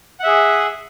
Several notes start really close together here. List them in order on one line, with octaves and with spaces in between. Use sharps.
F#5 E5 G#4